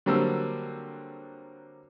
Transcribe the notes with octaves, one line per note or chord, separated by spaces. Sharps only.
D3 F#3 G3 A#3 C4 E6